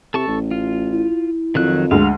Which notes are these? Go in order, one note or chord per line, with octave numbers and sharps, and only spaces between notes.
C3 A4 A5 C#6
A1
F4
E4
F2 D#3 F#3 F#6
D2 G#3 F5